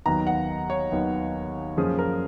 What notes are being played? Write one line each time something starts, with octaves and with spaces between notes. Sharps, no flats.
D#2 D#3 F#3 B3 A#5
F#5
C#5
D#2 D#3 F#3 B3
F#2 F3 A#3 C#4 G#4
A#4